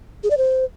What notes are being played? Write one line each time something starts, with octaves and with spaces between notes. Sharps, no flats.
G#4
D5
C5